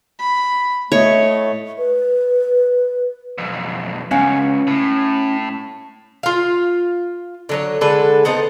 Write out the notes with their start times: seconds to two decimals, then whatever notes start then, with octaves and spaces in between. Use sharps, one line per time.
0.19 B5
0.92 A2 A3 C#5 D#5
1.78 B4
3.38 B1 F2
4.11 C#2 C#4 F5 F#5
4.67 A2
6.23 F4 F5
7.49 D3 F#3 C#5
7.81 D3 G#3 A4 B4
8.25 B3 C4 D#4 A4